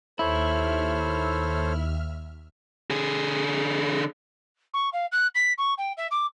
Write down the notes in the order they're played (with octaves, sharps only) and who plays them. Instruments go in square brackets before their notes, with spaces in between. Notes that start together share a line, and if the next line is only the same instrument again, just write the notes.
[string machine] D#2 E5 F6 [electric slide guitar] E4 [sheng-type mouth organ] A4 C5 C#5
[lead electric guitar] D3 G#4
[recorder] C#6
F5
F#6
B6
C#6
G5
E5
D6